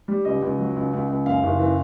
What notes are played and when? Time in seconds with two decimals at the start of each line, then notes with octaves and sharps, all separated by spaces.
0.08 G3
0.25 C#2 D#5
0.42 C#2
0.59 F#3
0.76 C#2
0.93 C#2
1.09 C#2
1.26 F#2 F5
1.43 F#1
1.59 E3